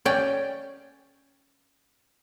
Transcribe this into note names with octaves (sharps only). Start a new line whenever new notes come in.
C#4 D5 G5